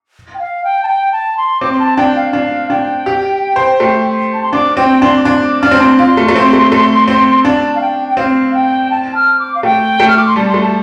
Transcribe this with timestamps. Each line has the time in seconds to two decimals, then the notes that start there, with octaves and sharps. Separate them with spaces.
0.34 G5
0.39 F5
0.64 G5
0.83 A5
0.88 G5
1.12 A5
1.37 C6
1.60 C4 D6
1.72 C6
1.79 A5
1.97 D4 G5
2.16 F5
2.33 D4 F5
2.70 D4 G5
3.06 G4
3.56 C5
3.80 A3
4.34 A5
4.43 C6
4.53 D4 D6
4.77 C4 G5
5.01 D4 C6
5.17 D6
5.25 D4 C6
5.44 D6
5.62 D4 F6
5.71 C4
5.80 D4 C6
5.99 F4 C6
6.17 A3
6.28 A3
6.36 C4
6.53 A3
6.72 A3
7.08 C4
7.45 D4 A5
7.75 F5
7.81 G5
8.08 G5
8.17 C4 F5
8.54 G5
8.90 A5
9.15 F6
9.39 D6
9.55 F5
9.63 A3 G5
10.00 A3
10.08 F6
10.17 D6
10.27 C6
10.36 G3 A5
10.49 A3 C6
10.61 A5